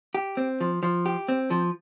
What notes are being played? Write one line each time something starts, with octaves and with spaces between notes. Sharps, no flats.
G4
C4
F3
F3
G4
C4
F3